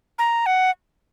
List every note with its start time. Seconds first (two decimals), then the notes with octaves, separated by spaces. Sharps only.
0.19 A#5
0.46 F#5